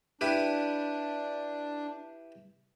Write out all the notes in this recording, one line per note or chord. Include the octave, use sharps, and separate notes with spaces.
D4 E4 G4 B4